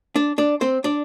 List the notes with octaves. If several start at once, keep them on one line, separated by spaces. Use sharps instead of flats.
D4 D5
D4 D5
C4 C5
D4 D5